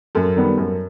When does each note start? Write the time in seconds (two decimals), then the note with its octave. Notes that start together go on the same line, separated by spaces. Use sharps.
0.15 F#2 A4
0.36 D#3 G3 B3
0.58 F#2